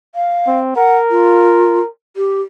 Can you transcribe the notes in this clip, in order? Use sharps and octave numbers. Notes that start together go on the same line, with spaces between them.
F5
C4
A#4 F#5
F4
G4